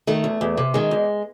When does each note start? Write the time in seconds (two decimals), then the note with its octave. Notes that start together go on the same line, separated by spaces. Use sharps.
0.07 D#3 A3
0.24 E2
0.41 E2
0.57 C3
0.74 D#3 G#3
0.91 E2